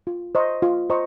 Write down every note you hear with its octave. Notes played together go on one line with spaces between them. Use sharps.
F4
C5 D#5 A#5 C#6
F4
C5 D#5 A#5 C#6